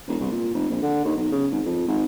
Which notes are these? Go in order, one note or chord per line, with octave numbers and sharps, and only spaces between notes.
E1
C2
A#2
F1
A#1
D3
D#2
B1
C#3
G#1
F2
G#1